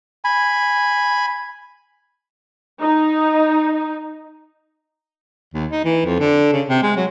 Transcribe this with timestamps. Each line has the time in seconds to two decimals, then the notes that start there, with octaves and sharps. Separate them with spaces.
0.24 G#5 B5
2.81 D#4
5.54 D#2
5.71 D#4
5.84 E3
6.05 F2
6.20 D3
6.53 C#3
6.68 C3
6.83 G#3
6.96 F#3